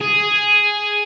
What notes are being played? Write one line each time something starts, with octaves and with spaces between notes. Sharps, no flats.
G#4